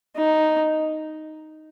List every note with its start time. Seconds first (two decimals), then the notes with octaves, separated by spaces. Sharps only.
0.17 D#4